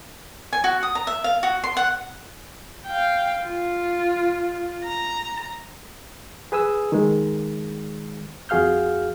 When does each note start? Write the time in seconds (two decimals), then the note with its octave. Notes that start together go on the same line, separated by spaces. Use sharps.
0.53 G#5
0.64 F#4
0.83 D#6
0.95 A#5
1.07 E5
1.24 F5
1.43 F#4
1.64 C6
1.77 F#5
2.86 F5 G5
3.44 F4
4.83 A#5
6.52 G#4 B4 G#5 D#6 E6
6.92 D#3 G#3
8.49 F2 F#4 G#4 F5 F6 G6